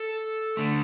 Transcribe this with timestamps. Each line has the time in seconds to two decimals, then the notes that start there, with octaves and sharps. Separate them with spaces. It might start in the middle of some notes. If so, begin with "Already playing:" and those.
Already playing: A4
0.57 D3 A3